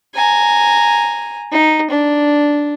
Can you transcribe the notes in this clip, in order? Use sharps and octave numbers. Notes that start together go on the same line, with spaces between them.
G#5 A#5
D#4
D4